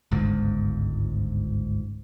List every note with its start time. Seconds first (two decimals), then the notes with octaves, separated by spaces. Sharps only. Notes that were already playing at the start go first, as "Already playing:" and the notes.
0.11 G1 C#2 G#2